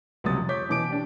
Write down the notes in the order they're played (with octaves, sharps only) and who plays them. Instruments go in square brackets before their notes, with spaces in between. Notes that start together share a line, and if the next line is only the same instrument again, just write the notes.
[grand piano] C#2 C3 F#3 G3 D#6 A6
F2
C#5 D6 G6 B6
B2 E3 D6 D7
D4 G4